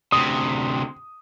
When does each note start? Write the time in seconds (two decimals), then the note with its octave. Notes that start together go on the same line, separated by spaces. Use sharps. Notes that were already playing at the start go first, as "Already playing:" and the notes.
0.12 D2 C3 D#6